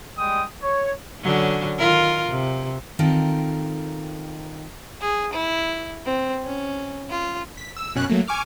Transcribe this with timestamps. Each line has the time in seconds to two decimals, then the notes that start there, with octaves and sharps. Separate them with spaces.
0.17 G3 G#3 G5 D#6
0.62 C#5
1.21 D3 F#3 C#4
1.78 D#3 F4 A#4
2.28 C3
2.99 D#3 C4 F4 A4 A#4
5.01 G#4
5.33 E4
6.05 C4
6.45 C#4
7.10 F4
7.57 B6
7.77 E6
7.95 F#2 B2 C#4 F#6
8.10 F#3 A3 A#3
8.28 G#5 C#6 D6 F6